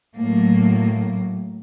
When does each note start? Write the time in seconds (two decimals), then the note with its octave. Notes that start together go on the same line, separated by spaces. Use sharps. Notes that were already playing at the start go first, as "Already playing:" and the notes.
0.18 A2 F#3 A#3